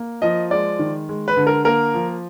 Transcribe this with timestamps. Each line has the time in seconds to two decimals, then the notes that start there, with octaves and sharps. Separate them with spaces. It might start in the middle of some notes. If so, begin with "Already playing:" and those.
Already playing: A#3
0.22 F3 D#5
0.51 G#3 D5
0.79 D#3
1.09 G#3
1.28 B4
1.37 D3
1.47 A#4
1.65 A#3 A#4
1.94 F3